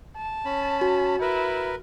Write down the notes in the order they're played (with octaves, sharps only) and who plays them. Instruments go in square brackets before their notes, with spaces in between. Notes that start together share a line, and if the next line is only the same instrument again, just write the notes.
[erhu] A5
[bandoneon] C#4 B5
[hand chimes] F#4
[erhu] E4 [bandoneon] A#4 B4